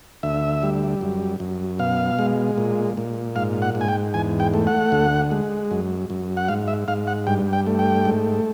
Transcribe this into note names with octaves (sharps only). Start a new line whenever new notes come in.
D2 E5
G3
F#2
F#2
B2 F5
G#3
A#2
A#2
G#2 F5
F#5
G#2
G#5
G5
E2 G#5
G5
A3
F#5
D2
G#3
F#2
F#2
F#5
G#2 F5
E5
G#2 F5
F#5
G2 G5
G5
A3
G5
G#2